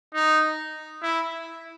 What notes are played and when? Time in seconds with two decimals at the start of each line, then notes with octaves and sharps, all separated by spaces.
0.13 D#4
1.03 E4